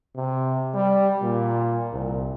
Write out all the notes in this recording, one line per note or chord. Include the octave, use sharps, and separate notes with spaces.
C3
G3
A#2
C2